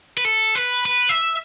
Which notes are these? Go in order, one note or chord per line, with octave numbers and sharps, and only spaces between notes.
B4
A4
B4
B4
E5